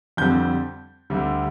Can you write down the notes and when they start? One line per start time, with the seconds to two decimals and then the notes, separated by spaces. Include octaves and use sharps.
0.17 F2 D3 G3 C4 G6
1.10 D2 D3 G3